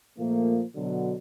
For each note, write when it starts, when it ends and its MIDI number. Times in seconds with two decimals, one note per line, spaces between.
0.18 0.63 46
0.18 0.63 53
0.18 0.63 57
0.18 0.63 58
0.76 1.15 47
0.76 1.15 50
0.76 1.15 54